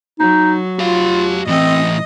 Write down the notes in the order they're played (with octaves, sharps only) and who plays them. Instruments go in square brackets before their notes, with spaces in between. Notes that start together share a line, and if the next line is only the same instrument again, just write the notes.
[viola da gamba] F#3 [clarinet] D#4
[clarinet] F4 [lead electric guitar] G4 F5
[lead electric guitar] A2 E3 [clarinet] C4 [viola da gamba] D#5